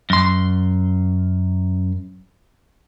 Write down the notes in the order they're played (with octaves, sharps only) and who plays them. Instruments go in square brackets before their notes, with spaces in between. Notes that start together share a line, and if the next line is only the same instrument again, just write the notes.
[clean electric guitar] F#2 C6